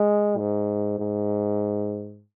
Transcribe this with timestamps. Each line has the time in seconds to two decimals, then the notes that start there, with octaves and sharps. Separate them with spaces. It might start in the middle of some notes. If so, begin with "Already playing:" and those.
Already playing: G#3
0.38 G#2
0.99 G#2